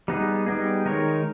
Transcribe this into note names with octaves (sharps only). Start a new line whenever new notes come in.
G3 B3 D#4 G#4
G3 B3 D#4 G#4
D#3 G#3 D#4 A#4 C#5